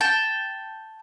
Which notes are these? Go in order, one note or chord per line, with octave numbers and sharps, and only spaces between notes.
G5 A5